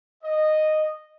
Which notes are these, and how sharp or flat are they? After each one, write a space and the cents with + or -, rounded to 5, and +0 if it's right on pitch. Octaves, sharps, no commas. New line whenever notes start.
D#5 -10